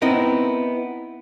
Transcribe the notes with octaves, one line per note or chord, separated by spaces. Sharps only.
B3 C4 D#4 E4 A#4